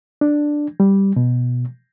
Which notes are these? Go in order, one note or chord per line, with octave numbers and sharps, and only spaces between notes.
D4
G3
B2